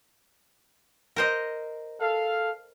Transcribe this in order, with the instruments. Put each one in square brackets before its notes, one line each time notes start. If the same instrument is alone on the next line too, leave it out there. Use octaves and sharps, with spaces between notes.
[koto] A#4 C5 D#5
[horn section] A4 F5